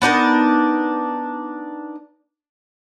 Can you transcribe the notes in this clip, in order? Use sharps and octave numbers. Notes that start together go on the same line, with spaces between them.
B3 D4 D#4 A#4